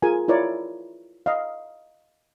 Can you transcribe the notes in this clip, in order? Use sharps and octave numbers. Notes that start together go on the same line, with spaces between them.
F4 G#4 A#4 G#5
E4 F4 A#4 C#5 D5
D#5 F5